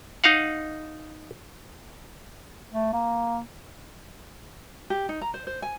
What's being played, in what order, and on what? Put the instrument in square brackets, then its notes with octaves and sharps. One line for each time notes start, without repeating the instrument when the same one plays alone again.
[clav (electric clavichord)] D#4 D#5 F5 F#5
[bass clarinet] A3
A#3
[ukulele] G4
D#4
A#5
C5
C5
G#5